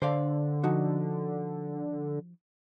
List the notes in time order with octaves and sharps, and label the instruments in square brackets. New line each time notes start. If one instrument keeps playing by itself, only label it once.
[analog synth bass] D3 [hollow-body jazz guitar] C5 D5 F5
[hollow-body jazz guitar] F3 D#4 F#4